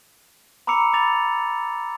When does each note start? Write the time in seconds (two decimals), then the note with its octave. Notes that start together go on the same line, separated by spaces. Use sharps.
0.67 A#5 B5 D6 E6 C#7 F7
0.93 B5 D6 A6 F7